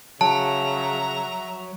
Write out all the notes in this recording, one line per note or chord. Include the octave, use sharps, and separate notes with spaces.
C#3 F#3 E5 A5 A#5